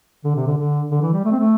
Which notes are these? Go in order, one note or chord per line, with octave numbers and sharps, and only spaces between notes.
D3
C3
D3
D3
D3
E3
G3
A3
C4
A3